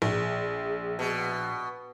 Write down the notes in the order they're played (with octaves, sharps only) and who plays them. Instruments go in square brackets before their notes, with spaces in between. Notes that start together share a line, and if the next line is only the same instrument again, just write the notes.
[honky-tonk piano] A#1 [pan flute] G#4
[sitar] B2